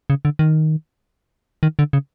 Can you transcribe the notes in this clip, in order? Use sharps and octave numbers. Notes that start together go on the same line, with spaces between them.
C#3
D3
D#3
D#3
D3
C#3